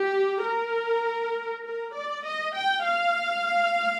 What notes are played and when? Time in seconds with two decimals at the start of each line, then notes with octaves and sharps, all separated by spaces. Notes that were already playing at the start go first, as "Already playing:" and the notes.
Already playing: G4
0.43 A#4
1.64 A#4
1.94 D5
2.24 D#5
2.54 G5
2.84 F5